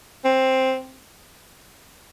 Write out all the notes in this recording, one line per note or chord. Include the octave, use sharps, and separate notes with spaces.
C4